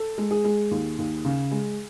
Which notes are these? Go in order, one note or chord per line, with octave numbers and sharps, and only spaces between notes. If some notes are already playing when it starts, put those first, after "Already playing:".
Already playing: A4
G#3
G#4
G#3
D#2
D#2
C#3
G#3